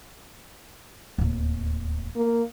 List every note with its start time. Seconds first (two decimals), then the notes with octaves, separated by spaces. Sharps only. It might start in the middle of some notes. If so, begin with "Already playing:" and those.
1.18 D1 D#2
2.16 A#3